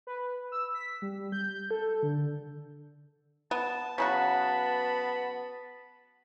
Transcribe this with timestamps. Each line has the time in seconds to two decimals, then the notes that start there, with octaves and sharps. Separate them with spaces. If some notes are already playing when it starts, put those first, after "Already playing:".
0.07 B4
0.52 E6
0.74 B6
1.02 G3
1.32 G6
1.71 A4
2.03 D3
3.51 B3 A5
3.98 C#3 F#3 B3 F#4 A5 B5